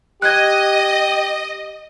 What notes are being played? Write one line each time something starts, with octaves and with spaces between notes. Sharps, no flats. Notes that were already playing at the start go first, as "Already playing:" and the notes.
G4 D#5 F#6 G#6